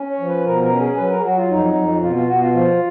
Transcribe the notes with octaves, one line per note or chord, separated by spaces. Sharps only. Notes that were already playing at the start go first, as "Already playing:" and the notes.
Already playing: C#4
C#5
F3
B4
B2 A#4
A#4
C#4
G#4
F#3 B4
A#4
G#4
F#3 F#4
F4
F2 D#4
F2
B2 F4
F4
B2 F#4
F4
F3 F4